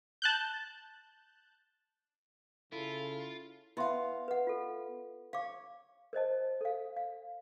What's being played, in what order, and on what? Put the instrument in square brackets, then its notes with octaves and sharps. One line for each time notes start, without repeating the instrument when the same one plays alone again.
[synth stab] A5 F#6 G6
[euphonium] C#3 [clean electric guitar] E4 [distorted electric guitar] F4 [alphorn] A4
[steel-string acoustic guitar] B3 F5 [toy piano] E4 E5 C6
[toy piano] B4 F#5
F4 A4
[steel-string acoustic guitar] C#5 [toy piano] F5 D6
[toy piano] A#4 C5 D#5 A5
A4 F5
F5